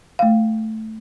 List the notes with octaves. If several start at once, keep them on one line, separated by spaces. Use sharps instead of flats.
A3 F5